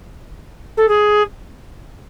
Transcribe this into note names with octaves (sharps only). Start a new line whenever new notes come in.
A4
G#4